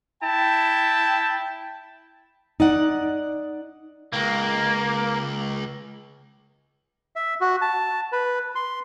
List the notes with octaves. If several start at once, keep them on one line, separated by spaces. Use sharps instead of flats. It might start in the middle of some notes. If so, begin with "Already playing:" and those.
E4 G5 A5
D#4 D5 F#5
C#2 A#3
E5
F#4
A5
B4
C6